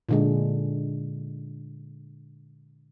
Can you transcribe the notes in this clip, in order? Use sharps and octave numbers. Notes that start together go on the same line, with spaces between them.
A#2 D3 G#3